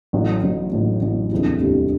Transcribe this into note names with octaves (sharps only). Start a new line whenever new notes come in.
A1 A2 F#3
A1 A2 F#3
A1 A2 F#3
A1 A2 F#3
E1 D2 C3 E3 G3
E1 D2 C3 E3 G3